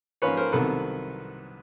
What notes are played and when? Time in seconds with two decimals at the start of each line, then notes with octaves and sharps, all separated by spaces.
0.22 G#2 F3 A#3 C#4 B4 C#5
0.37 A#4 C5
0.52 C2 C3 D#3 F#3 B3 A4 B4